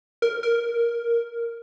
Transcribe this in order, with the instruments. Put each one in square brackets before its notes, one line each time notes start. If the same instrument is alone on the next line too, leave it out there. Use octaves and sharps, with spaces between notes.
[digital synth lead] A#4
A#4